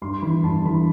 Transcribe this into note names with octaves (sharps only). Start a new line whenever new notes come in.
G2 C6
E3 B5
G2 A5
E3 B5